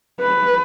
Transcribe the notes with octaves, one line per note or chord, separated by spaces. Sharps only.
B4